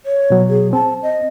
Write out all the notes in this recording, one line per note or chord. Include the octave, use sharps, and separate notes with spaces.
C#5
B2 F#3
G#4
C4 A5
D#5